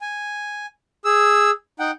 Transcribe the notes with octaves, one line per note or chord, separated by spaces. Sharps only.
G#5
G#4 E6
D#4 F#5 G5